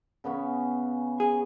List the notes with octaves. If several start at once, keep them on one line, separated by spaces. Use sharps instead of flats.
C#3 B3 C#4
G#4